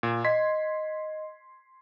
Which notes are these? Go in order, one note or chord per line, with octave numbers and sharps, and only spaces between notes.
A#2
D#5 C6 G#6 B6